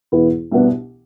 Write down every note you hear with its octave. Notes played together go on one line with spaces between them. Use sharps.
E2 B2 B3 E4 B4
C2 B2 B3 D4